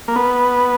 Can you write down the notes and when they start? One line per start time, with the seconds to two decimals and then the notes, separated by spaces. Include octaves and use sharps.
0.08 A#3
0.16 B3